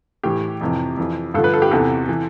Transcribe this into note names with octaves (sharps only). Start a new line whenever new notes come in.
A2 E3 G4
F2 C3 E3
F2 E3
G2 D3 F3 A4
B4
A4
G4
E2 C3 E3 A4
E3